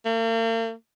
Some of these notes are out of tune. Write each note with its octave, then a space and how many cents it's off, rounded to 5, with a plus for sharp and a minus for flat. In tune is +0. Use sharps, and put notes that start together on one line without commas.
A#3 -45